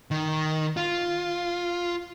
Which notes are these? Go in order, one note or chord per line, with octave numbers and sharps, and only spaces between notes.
D#3
F4